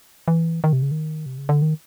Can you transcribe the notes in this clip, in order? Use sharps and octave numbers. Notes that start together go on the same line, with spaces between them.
E3
D#3
C3
C#3
D#3
C3
C#3
D3
D#3